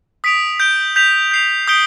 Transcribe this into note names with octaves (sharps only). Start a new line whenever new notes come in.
D#6 B6 D7 F7
G6 B6 D7 G7
G6 B6 F7
G6 C7 F7
D#6 G6 B6 D7 G7